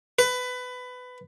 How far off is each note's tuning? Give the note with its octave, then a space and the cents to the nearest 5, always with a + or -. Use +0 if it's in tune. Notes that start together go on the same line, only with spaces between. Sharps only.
B4 +20